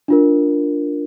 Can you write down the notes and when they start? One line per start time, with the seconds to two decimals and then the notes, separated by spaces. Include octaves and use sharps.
0.08 D4 F4 A#4